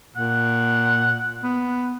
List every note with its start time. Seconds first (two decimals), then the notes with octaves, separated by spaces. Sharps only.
0.16 A#2 F#5
1.43 B3